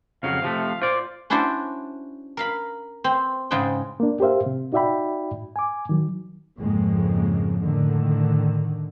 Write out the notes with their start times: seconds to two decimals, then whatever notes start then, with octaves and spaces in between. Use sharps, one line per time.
0.23 F2 C#3 F#3 F5
0.42 C3 F3 A3
0.82 F4 C5 D5
1.30 C#4 D4 E4 F#4 C5 D5
2.37 A#4 F5 B5
3.04 C4
3.51 G#2 C#3 G#3 D#5 G5
4.00 A#3 D4
4.20 G4 A#4 C5 E5 F5
4.46 C3
4.73 D#4 F#4 D5 E5 G5 B5
5.56 G#5 D6
5.89 D#3 F#3
6.58 F2 G#2 C#3 F3 G#3 A#3
7.63 A2 D3 D#3